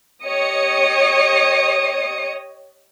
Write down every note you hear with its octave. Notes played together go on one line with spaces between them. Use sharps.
G4 C#5 D#5 D#6 C#7